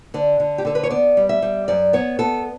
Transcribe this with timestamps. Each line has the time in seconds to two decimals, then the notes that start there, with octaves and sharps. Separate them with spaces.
0.14 D3 D5
0.40 D3
0.58 G4
0.65 D3 A4
0.75 B4
0.83 C#5
0.91 B3 D5
1.17 G3
1.29 E5
1.42 G3
1.68 F#2 D5
1.93 B3 C#5
2.19 B3 A4